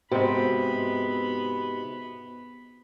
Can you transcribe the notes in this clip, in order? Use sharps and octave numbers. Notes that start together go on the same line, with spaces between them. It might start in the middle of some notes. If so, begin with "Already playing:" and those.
G#2 C3 B3 F#4 B5